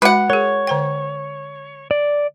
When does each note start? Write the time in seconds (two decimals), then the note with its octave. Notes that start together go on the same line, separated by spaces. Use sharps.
0.02 G#3 F#4 B4 F#5
0.30 G#4 A#4 C#5
0.67 D3 C5 G5
1.91 D5